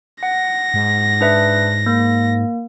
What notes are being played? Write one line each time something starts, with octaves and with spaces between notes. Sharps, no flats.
F#5 A#6
G#2
D4 B4 E5
A#3